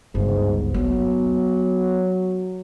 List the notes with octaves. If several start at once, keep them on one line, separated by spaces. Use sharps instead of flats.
G1 C#2 G#2
F#3 B3